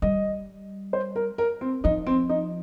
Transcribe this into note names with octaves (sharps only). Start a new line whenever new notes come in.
G3 D#5
C5
A#4
A#4
C4
F3 D#4
C4
D#4